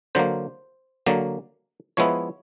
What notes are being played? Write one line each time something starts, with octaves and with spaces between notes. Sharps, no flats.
D3 F#3 A#3 C5
D3 F#3 A#3
F3 G#3 B3 E4 C#5